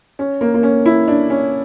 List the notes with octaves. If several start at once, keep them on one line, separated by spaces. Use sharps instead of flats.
C#4
A#3
A#3
C#4
E4
D4
C#4